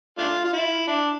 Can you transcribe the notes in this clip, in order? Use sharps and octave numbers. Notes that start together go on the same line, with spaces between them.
A3 D4 F4
F4
E4
D4